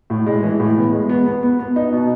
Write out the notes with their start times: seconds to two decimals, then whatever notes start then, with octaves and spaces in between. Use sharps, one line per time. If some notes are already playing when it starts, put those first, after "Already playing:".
0.10 A2
0.26 G#3
0.43 E3
0.60 A2
0.76 B3
0.93 G#3
1.09 B3
1.26 B3
1.43 B3
1.59 B3
1.76 D#4
1.93 B2